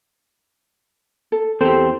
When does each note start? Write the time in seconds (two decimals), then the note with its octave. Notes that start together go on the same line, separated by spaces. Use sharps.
1.32 A4
1.61 E2 C4 G4 A4 C5